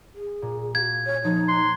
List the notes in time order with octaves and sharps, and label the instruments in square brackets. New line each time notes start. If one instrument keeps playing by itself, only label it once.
[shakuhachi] G#4
[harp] A#2
[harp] F#4 F5 [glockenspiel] G#6
[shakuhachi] C#5
[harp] F3 A#3 [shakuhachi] D#4
[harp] A#5 F#6 G#6 [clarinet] C6